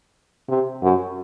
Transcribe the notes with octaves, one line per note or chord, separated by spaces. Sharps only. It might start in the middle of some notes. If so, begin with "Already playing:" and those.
C3
F#2